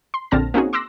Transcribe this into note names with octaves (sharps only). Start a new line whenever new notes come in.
C6
A#1 D3 C4 A5 F6 A#6
A#3 C4 C#4 D#4 F#4 G#4
C6 D6 E6 F#6 A#6